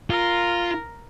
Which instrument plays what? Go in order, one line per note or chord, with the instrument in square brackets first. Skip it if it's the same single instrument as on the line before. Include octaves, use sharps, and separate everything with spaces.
[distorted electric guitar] F4 [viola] A#4